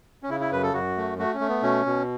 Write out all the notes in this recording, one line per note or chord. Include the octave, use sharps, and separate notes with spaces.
C#4
C#3 E4
E4
F#2 B4
A4
F#2 F#4
A3
A3 F#4
C#4
A3
B3
B2 C#4
B2